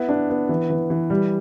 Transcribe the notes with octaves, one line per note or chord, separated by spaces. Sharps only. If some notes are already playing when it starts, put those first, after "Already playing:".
Already playing: B3 E4
D4
B3
E3
E3
E3
G3